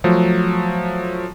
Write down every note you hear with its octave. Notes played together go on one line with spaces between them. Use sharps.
F3 F#3 A3